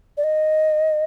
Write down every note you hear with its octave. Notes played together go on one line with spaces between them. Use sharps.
D5
D#5